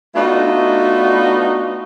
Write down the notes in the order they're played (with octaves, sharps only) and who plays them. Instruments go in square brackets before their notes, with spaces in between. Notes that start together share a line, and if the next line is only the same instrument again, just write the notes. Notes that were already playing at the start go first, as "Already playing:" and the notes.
[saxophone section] A3 B3 D4 D#4 F4 F#4